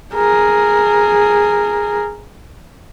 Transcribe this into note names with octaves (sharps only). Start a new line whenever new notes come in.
G#4 A#4